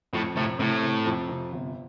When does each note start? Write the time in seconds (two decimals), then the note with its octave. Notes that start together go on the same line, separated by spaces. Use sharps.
0.13 F2 A2
0.36 A2 C3
0.59 A2 C3
0.83 C3
1.06 F2
1.29 C3
1.52 G1